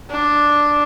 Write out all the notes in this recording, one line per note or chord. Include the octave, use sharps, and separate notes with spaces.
D4